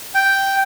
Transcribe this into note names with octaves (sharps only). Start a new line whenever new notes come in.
G5